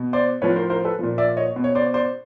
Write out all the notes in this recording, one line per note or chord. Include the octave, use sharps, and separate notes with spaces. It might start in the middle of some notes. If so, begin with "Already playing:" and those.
Already playing: B2
C5 D5
A2 F3 B4 C#5
A#4 C5
A#4 C5
A4 B4
A#2 F3
D5 E5
C#5 D#5
B2
C#5
C5 D5
C5 D5